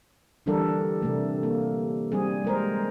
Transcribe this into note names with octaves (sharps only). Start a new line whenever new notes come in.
D3 E3 G3 D4 A4 A#4
C3 A3
A#3
G3 C4 G#4
G#3 A#4 C5